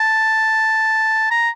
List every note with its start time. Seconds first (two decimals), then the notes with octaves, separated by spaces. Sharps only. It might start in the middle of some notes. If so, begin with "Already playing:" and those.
Already playing: A5
1.31 A#5